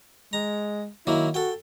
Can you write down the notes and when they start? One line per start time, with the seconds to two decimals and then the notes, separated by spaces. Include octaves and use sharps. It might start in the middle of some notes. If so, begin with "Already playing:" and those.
0.33 G#3 A#5
1.07 D#3 F#3 A#3 E4
1.34 F#4 A4 G5